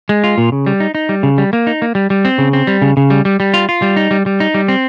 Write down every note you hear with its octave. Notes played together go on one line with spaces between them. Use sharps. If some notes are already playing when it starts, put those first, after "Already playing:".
G#3
F4
A#2
C#3
G3
D#4
D#4
G3
C#3
G3
A#3
D#4
A#3
G3
G3
C4
C#3
C4
G3
C#3
C#3
G3
G3
G3
F4
F4
G3
D#4
G3
G3
D#4
G3
C4